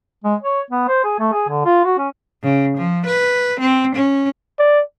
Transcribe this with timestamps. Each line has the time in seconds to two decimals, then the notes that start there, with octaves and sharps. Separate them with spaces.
0.24 G#3
0.42 C#5
0.70 B3
0.88 C5
1.04 G#4
1.20 A3
1.33 G#4
1.49 D3
1.65 F4
1.85 F#4
1.98 C#4
2.43 C#3
2.77 F3
3.06 B4
3.60 C4
3.95 C#4
4.59 D5